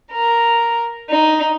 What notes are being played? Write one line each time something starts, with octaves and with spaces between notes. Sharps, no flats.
A#4
D#4